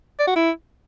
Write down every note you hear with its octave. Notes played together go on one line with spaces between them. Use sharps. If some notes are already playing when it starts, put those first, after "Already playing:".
D5
F#4
E4